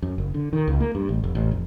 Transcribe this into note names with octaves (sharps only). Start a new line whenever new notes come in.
F#2
F#1
D3
D#3
C#2
A#3
G2
A1
F1
A1
F1